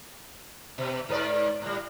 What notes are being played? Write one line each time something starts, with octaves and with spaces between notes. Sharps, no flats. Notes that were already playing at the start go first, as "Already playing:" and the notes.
B2
G#2 B4 D5
A2 G3